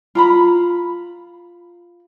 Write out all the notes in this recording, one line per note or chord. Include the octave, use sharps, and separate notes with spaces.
F4 A#5 B5